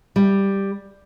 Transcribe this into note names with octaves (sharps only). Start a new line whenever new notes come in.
G3